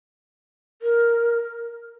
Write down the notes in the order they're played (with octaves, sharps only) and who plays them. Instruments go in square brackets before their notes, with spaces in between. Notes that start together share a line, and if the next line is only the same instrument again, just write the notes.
[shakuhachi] A#4